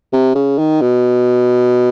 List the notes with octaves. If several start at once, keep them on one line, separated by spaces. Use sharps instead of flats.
C3
C#3
D#3
B2